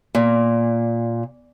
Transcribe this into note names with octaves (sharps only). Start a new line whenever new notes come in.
A#2